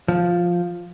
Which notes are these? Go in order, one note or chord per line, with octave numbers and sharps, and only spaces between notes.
F3